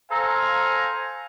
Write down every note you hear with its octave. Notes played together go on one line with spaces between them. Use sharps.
A4 C5 F5 G#5 A#5